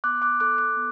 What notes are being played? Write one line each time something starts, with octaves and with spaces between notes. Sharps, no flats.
B3 D6 F#6
D6 F#6
A4 D6 F#6
D6 F#6
B3